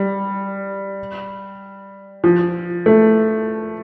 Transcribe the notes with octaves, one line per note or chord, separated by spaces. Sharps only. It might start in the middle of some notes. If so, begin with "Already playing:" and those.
Already playing: G3
F3
A3